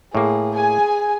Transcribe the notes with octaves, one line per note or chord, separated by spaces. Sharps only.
A2 A#3 G#4
G#4 G#5